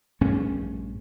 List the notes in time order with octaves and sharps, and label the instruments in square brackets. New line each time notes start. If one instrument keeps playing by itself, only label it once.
[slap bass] A#1 G2 A3 C#4